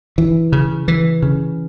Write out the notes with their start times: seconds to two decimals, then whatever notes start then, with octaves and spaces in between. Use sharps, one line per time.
0.18 E3
0.52 C#3
0.88 E3
1.23 C#3